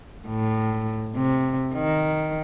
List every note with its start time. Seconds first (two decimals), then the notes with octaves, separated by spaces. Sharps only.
0.28 A2
1.16 C3
1.74 D#3